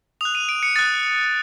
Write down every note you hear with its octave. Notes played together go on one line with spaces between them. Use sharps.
D#6 F#6 F7
D#7
D7
C#7
D#6 F#6 A6